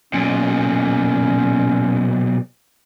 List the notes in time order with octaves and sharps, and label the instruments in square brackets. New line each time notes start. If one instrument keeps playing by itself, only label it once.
[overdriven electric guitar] B1 A#2 [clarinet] C#4